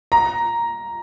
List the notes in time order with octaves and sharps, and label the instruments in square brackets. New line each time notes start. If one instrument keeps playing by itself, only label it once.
[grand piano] A#5